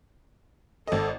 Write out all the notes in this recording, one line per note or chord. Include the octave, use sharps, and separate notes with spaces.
G#1 A4 D#5